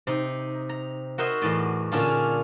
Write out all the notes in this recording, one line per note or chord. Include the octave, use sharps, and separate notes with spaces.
C3 D#4
A#5
F#4 A#4 C5 C#5 D#5 E5
E2 A2 D5 D#5
A#2 D3 C#4 D4 F4 G#4